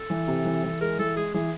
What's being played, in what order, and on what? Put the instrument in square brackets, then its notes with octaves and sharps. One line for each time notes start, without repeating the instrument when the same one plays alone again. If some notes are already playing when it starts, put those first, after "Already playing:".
Already playing: [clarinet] A4
[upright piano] E3
C3
E3
E3
[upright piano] G#3 [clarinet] A#4
[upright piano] E3 [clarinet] A4
[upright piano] G#3 [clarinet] G#4
[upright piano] E3 [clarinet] G#4